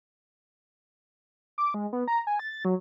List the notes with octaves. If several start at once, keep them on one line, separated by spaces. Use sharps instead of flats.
D6
G#3
B3
A#5
G#5
A6
F#3